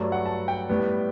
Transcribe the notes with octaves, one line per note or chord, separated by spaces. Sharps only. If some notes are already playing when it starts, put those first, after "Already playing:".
Already playing: G2 F#3 A3 D5
F#5
A5
G5
A2 G3 B3